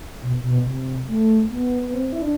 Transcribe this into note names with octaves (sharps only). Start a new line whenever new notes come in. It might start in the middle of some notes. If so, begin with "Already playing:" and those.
B2
B2
C3
A3
B3
B3
C4
E4
D4